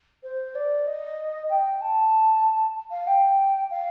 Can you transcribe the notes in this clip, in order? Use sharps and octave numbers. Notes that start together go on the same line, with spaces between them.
C5
D5
D#5
G5
A5
F5
G5
F5